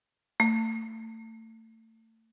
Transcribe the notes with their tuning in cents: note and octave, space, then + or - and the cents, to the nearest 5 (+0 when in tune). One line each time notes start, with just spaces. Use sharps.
A3 +30